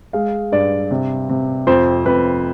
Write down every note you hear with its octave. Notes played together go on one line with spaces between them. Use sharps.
G#3 F5
G2 D5
C3
C3
F2 C5
F2 B4